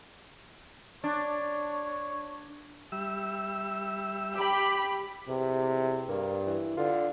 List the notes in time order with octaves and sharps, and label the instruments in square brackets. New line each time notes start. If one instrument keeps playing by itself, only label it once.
[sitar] D4 [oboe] C#5
[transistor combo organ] G3 E5 E6
[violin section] G4 B5
[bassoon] E2 [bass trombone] C3
[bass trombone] G2 [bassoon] A#3
[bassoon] E3
[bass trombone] D3 [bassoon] F4